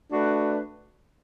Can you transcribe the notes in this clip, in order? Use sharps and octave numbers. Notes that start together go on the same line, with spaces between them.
A3 D4 F#4 B4